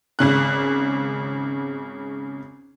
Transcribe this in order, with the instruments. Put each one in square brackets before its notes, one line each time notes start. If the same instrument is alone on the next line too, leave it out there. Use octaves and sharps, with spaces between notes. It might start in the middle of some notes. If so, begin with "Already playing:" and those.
[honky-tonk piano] G#1 C#3 F#6